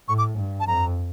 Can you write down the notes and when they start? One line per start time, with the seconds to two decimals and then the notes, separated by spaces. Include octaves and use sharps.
0.08 A2 C#6
0.18 D6
0.38 G2
0.60 A5
0.67 F2 A#5